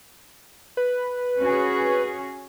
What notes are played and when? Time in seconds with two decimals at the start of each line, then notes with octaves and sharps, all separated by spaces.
0.77 B4
1.41 C#4 F#4 G#4